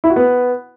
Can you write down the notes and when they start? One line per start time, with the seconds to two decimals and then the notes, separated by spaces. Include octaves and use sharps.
0.04 E4
0.10 F#4
0.16 B3